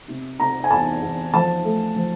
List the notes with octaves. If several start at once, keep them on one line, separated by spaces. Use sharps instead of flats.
C3
C3 A#5
G#5
E2 A5
E2
F3 A5
A3
F3